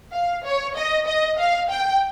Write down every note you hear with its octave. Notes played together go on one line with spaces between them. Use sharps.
F5
C#5
D#5
D#5
F5
G5